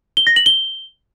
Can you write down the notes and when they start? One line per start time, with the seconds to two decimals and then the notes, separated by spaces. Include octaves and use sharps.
0.17 G7
0.27 A#6
0.36 F#7
0.46 G7